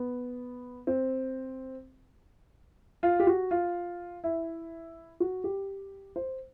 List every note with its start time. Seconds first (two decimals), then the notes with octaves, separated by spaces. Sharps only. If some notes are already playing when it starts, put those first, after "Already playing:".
Already playing: B3
0.87 C4
3.03 F4
3.20 G4
3.27 F#4
3.51 F4
4.24 E4
5.20 F#4
5.44 G4
6.16 C5